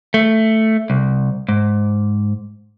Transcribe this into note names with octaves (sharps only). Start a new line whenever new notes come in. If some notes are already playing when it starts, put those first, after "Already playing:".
A3
C2
G#2